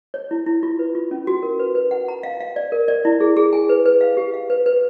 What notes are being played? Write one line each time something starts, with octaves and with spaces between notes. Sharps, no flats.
C#5
E4
E4
F4
B4
F4
C#4
F#4
A#4
B4
B4
F#5
A#5
F5
F5
D5
A#4
D5
E4
G#4
G#4
G#5
B4
B4
F5
G4
F5
B4
B4